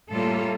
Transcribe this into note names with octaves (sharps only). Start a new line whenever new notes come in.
A2 G3 A#3 F4 A4